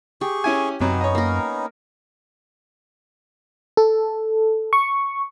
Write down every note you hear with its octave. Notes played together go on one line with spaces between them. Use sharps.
G4 G#4 C#6
C#4 E4 G#5
F#2 C3 F#3 B3 C#4 D#4
C#5 D#5
A#3 A#4
A4
C#6